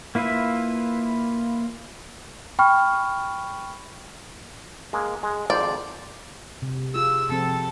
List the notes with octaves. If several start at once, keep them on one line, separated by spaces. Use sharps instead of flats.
A#3 E4 F4 B4 E5
G5 B5 C#6 F6
G#3 A#3
G#3
G#1 F2 C5 D5
C3
F4 G#4 E6
C3 F3 C4 A4